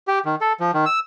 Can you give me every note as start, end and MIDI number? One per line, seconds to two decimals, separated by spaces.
0.07 0.19 67
0.25 0.35 51
0.41 0.53 69
0.60 0.71 53
0.74 0.85 51
0.86 1.00 88